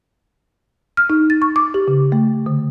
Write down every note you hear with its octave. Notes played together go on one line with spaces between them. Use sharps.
F6
D#4
A6
C#6
D6
G4
C#3
A3
D3